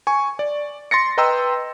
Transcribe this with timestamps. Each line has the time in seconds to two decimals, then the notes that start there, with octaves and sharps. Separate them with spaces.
0.07 G#5 C#6
0.39 D5
0.91 C6 A6 A#6 C#7
1.17 B4 D#5 G5 A#5 C6 E6